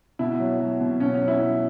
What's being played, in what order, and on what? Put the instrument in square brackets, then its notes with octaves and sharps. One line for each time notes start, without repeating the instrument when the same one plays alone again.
[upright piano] B2 E4
F#3
F#3
B2
B2 C#4
C#4
F#3
E4
F#3